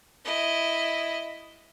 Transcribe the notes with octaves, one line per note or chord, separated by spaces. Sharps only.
E4 D#5